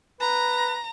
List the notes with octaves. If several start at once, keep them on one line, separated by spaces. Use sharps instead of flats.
B4 A#5